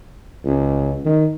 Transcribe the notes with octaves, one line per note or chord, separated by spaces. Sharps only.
C#2
D#3